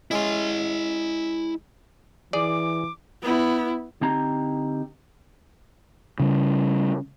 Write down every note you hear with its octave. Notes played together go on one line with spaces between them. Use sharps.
G#3 C#4 E4 D#5 C6
E3 G#4 D5 D6
B3 E4
D3 C4 D#4 G4 A#5
C#3 G3